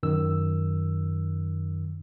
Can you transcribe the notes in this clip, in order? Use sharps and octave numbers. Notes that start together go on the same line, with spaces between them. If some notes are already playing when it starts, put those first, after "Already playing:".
F#2 D#3 E6